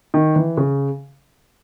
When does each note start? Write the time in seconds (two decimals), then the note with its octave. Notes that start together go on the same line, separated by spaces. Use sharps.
0.14 D#3
0.36 E3
0.57 C#3